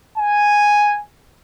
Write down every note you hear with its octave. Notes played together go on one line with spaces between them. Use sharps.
G#5